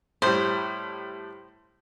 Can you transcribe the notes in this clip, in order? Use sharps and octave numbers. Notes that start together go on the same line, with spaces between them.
A2 G3 C5